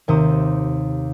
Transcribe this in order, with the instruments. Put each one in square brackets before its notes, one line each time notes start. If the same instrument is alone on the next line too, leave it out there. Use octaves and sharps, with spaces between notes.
[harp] D#2 C3 C5 D#6 E7